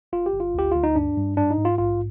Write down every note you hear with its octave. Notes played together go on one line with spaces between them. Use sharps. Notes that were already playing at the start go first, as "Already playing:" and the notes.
G1 F4
G4
G1
F4
D2 G4
D2 F4
D#4
G2 D4
G2
G#2 D4
D#4
G#2
F4
A#1 F4